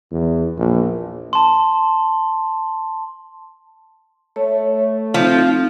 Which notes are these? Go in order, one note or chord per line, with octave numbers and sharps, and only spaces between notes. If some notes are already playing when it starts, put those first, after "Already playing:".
E2
A#1
A5 C6
A3 C#5
F3 C4 D#4